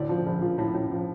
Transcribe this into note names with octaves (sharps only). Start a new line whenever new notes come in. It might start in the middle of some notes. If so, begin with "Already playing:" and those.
Already playing: D2 A2 D5
F3
A#1
F3
A2
A2
F3